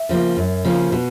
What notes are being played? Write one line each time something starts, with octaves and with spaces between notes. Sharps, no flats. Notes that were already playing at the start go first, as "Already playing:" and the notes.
Already playing: E5
C#3 F3 A#3
F#2
C#3 F3 A#3
B2